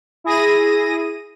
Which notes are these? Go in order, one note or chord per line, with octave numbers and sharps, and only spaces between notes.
E4 G#4 A#6 D#7